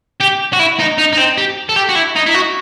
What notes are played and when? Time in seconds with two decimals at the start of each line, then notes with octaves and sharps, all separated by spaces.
0.20 G4
0.53 F#4
0.59 E4
0.79 D#4
0.98 D#4
1.13 D#4
1.17 C4
1.38 G4
1.69 A4
1.76 G4
1.89 F#4
1.95 E4
2.16 D#4
2.26 E4
2.34 F#4